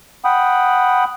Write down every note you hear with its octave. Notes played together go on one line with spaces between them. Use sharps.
F#5 G5 B5 D#6